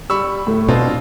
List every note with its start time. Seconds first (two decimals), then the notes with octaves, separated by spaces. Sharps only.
0.10 G3 B5 C#6 E6
0.47 A2 A3
0.68 B2 C4 D4 F4